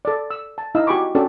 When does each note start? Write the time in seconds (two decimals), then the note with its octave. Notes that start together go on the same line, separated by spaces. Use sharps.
0.05 A4 D5
0.30 E6
0.58 A5
0.75 D#4 E4 D#5 F5 E6
0.87 F#4 G4 G#5 B5 C#6 D6
1.15 C#4 D4 F#4 G4 A4 D5